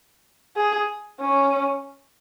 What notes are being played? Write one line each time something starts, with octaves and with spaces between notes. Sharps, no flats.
G#4
C#4